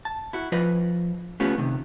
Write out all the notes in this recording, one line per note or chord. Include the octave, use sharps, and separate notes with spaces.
A5
E4 F#4
F3 F4 B4 D#5
A3 B3 C#4 F4 G4
C3 D#3